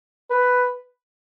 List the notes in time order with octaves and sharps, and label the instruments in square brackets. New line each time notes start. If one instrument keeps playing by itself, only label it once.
[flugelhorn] B4